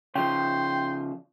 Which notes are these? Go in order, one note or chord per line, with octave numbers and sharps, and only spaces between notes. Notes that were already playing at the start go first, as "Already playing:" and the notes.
C#3 F3 C5 G5